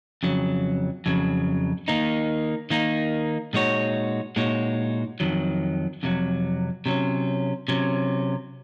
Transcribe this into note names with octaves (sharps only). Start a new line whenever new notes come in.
F2 C#3 F#3
F2 C#3 F#3
D#3 A#3 D#4
D#3 A#3 D#4
A#2 G#3 D#4 F#4 C#5
A#2 G#3 D#4 F#4 C#5
F2 C3 D#3 F#3
F2 C3 D#3 F#3
C3 F#3 C#4
C3 F#3 C#4